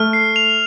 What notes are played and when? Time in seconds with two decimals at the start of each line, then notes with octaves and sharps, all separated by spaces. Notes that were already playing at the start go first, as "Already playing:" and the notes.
Already playing: A3 F6
0.13 C7
0.36 F7